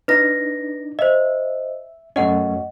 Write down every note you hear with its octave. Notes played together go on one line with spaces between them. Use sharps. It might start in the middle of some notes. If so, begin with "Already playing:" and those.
D4 D#4 B4 A#6
C5 D#5 E5
F#2 A3 C#4 D#5 F#5